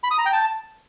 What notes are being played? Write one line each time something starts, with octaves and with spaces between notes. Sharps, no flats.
B5
D#6
A#5
G5
A5